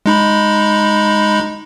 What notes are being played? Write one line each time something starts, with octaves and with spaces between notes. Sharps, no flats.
G#3 D#4 B5